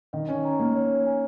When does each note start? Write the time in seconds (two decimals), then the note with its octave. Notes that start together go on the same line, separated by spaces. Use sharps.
0.13 D#3 D#5
0.29 C#4
0.45 A#5
0.60 A#3
0.76 C#5
1.06 G#5